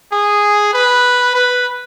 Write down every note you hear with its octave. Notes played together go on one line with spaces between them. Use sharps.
G#4
B4
B4